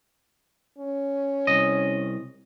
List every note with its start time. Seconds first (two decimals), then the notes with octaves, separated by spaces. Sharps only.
0.78 C#4
1.47 C2 D#5